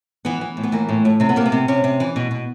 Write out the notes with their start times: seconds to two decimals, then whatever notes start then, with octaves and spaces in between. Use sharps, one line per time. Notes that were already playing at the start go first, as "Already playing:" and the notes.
0.25 E3 B3
0.41 E3
0.57 A2
0.63 B3
0.72 E3 A#3
0.89 A2
1.05 A2
1.20 C3 C4
1.29 B3
1.36 C3 A#3
1.46 B3
1.52 C3
1.68 C3 C#4
1.84 C3
2.00 E3
2.16 B2
2.31 B2